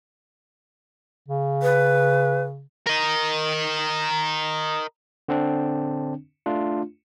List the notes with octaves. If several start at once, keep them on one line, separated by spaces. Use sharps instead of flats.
C#3
B4
A#4 D#5
D3 C4 D4
A3 D4 F4